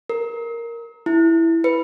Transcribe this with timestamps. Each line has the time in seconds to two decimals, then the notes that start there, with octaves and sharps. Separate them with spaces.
0.10 A#4
1.06 E4
1.64 B4